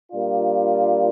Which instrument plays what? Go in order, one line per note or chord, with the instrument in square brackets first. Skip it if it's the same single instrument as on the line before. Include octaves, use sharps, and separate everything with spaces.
[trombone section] A#2 G3 A#3 D4 F4